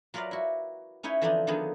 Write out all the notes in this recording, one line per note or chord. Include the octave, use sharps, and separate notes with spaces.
F#3 F4 A#4 B4 D5 F5
E4 F#4
C#4 D#4 E4 B4 C#5
D3 E3 F3 C4 D4 D#4
D3 D#3 F3 F#3 B3 G#4